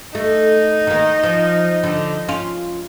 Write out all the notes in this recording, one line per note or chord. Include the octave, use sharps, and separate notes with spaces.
A3 D#4
D#3 A#3
F3
D3
C#4 F4